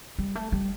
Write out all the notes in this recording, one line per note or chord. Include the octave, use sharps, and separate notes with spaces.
G3
A3
G3